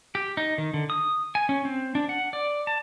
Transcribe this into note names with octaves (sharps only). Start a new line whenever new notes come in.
G4
D#4
D#3
D3
D#6
G#5
C#4
C4
D4
F#5
D5
A5